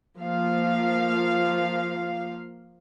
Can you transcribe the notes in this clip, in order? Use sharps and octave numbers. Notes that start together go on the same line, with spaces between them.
F3 A#3 F5